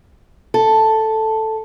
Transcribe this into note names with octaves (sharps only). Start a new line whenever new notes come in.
A4